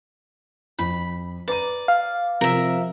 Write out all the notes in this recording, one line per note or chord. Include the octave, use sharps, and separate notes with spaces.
F2 B5
B4 D5 A#5 D#7
F5
C3 F3 A#4 E5